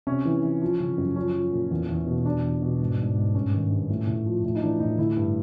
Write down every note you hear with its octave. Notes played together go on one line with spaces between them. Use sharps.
C3 C#4
E3
E3
F3
C#3
F#2
F3 C#4
F3
A#2
E2
E2
B2
E2 D4
E2
B2
G#2
G#2
G#2
G2 C#4
D#3
G2
A2
A2
F3
A2
D#4
E3 D4
A2 D#4
D3 E4
G2